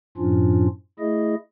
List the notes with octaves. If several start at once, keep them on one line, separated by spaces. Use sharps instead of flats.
F#2 A2 F3 C#4 D4 F4
A3 E4 G#4 D#5